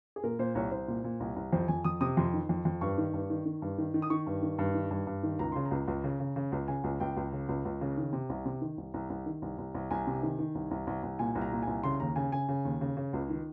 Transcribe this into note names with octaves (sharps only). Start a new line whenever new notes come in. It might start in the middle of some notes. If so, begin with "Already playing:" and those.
G#4
A#2 A#4
A#2 C5
C2 C#5
C2 C5
A#2
A#2
C2
C2
F2 C5
F2 G#5
F2 D#6
C3 D#6
F2 C6
D#3
F2
F2
G2 C#6
D#3
G2
D#3
D#3
G2
D#3
D#3
D#6
D#3 C#6
G2
D#3
G2
D#3
G2
G2
D#3
C#2 A#5
C#3 C6
A#5
C#2
C#2
C#3
C#3
C#3
C#2
C#3 G#5
C#2
C#2 G5
C#2
C#3
C#2
C#2
C#3
D#3
C3
C2
C3
D#3
C2
C2
C2
D#3
C2
C2
C2
C2 G#5
C3
D#3
D#3
C2
C2
C2
C2
A#2 G#5
C2
A#5
A#2
C2 G#5
C#3 C6
D#2 A#5
C#3 G#5
C#3 G#5
C#3
D#2
C#3
C#3
C#2
D#3